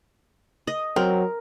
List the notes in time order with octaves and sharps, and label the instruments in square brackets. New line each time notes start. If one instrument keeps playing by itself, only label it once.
[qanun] D#5
[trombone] F#3 [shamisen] C4 [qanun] A#4